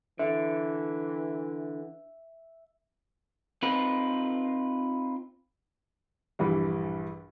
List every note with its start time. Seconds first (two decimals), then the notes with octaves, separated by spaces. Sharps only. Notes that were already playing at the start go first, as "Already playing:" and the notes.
0.19 D3 E3 E5
3.63 C4 D#4 F4 B4
6.39 A#1 G2 E3 G3